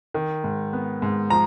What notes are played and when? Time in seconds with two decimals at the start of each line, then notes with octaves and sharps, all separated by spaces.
0.14 D#3
0.44 G#2
0.73 B3
1.02 G#2
1.30 F3 A#5